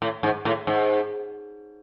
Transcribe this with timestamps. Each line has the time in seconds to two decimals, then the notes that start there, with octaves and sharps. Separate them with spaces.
0.02 A2
0.23 G#2
0.45 A2
0.67 G#2